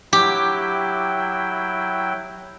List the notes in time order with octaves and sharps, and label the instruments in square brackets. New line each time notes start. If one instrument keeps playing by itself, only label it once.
[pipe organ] F#3 E4 G5 [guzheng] G4